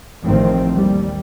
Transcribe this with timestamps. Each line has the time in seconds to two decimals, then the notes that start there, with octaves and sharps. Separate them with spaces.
0.24 A1 D#3 F3 C4
0.75 D#2 G3